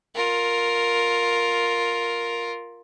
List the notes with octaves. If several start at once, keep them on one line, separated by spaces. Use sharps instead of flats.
F4 A#4